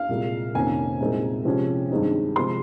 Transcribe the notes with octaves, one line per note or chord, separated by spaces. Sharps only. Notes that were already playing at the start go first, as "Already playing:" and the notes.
Already playing: F5
C2 A#2 G#3
F2 C3 D#3 A#3 C#4 G#5
C2 A#2 G#3 C4 D#4
C3 F3 G#3 C#4
G2 D#3 G#3 C4 D#4
C3 F3 G#3 C4 C6